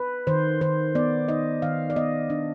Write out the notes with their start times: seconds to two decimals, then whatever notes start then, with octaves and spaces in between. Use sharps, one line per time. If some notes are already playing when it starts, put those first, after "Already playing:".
Already playing: B4
0.27 D#3 C5
0.61 D#3 C5
0.95 B3 D5
1.28 D#4 D#5
1.62 D#3 F5
1.90 D5
1.96 B3 D#5
2.30 D4